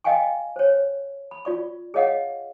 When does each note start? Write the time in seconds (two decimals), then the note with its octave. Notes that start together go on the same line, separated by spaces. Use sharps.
0.04 D#5 F5 G5 G#5 C#6
0.56 C5 C#5
1.31 B5
1.45 F4 D5 C#6
1.94 G#4 C#5 D#5 F5 F#5